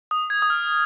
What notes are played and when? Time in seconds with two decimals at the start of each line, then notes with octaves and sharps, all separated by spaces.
0.11 D#6
0.30 G#6
0.42 D#6
0.50 F6